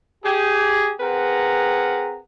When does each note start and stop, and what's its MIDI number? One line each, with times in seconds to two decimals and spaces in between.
0.25 0.94 67
0.25 0.94 68
1.00 2.18 60
1.00 2.18 68
1.00 2.18 70
1.00 2.18 71
1.00 2.18 78
1.00 2.18 82